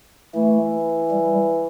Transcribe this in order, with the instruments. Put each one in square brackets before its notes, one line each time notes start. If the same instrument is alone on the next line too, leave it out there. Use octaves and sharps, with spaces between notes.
[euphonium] E3 [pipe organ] A3
[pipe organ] G3